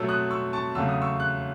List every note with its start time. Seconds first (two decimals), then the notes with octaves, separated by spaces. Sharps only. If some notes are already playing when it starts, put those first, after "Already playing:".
Already playing: B2 F#3 A3 C#6 E6
0.09 D#6 F#6
0.31 C#6 E6
0.53 A5 C#6
0.75 E2 C#3 F#3 A3 E6
0.89 D#6
1.02 C#6 E6
1.20 F#6